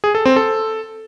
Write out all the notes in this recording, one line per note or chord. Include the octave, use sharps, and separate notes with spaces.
G#4
A4
C4
A4